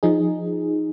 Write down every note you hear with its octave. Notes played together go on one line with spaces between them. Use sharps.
F3 D#4 G#4